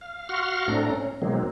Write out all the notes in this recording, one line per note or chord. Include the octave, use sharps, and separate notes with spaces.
F5
F#4 F5 F#5 C6 C#6 F6
A2 A3 C4 D4 A#5
C#4
B2 D#3 F#3 G#3 A#3 C4